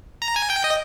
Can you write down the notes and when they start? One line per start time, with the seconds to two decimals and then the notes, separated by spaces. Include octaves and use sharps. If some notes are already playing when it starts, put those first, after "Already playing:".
0.22 A#5
0.36 G#5
0.50 G5
0.64 D#5